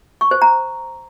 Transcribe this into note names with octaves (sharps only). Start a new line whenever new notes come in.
C#6
C5
A#5